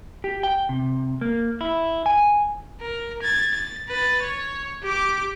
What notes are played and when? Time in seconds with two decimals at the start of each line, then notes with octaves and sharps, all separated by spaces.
0.24 G4
0.43 G5
0.69 C3
1.21 A#3
1.61 E4
2.06 G#5
2.81 A#4
3.22 G#6 A6
3.53 A6
3.88 B4 A6
4.22 C#5
4.83 G4 D6